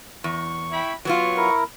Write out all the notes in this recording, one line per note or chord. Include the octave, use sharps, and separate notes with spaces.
E2 C#6
E4 G5 B5
F#3 B3 F4 C#5 C#6
E4 A#4